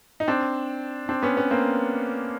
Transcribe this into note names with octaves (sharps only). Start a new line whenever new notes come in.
D#4
C4 D4
C4 D4
B3 C#4
B3 C#4
A#3 C4